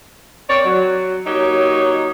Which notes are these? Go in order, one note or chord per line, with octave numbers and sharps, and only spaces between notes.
C4 A#4 C#5 D5
F#3
F#3 A#3 D#4 G4 C#5